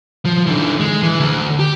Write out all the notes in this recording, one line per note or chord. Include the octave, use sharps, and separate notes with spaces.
F3
D3 E3
G#3
E3
D2
G4